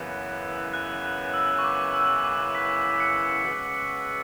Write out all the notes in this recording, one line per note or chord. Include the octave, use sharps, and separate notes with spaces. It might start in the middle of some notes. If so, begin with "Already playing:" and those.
Already playing: F#2 C#3 E3 B3
F#6
E6
C#6
D6
E6
D6
B6
C#7
C#3 G#3 B3 F#4